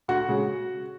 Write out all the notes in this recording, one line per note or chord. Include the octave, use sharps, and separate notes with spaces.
D2 F#4 F#5
C#3 G#3